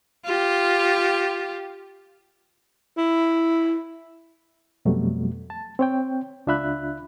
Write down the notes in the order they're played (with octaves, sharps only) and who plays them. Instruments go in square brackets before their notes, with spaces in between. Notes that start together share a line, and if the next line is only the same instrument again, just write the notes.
[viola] F4 G4
[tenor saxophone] E4
[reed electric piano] F2 B2 F#3 G3 A3
A5
C4 C#5 G5
C#2 D4 F4 E5 B5 F#6